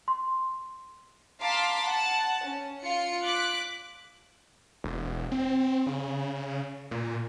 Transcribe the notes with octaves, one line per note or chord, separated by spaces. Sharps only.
C6
F5 A5 A#5 C6 D6 B6
F#5 A5
C#4
F4 C#7
D6 F#6 B6
E1
C4
C#3
A#2